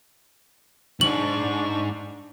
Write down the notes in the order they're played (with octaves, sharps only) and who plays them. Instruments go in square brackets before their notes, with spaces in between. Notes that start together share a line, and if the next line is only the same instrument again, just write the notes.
[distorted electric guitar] B1 G#2 [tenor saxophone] D4 [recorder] C#6 [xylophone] F#7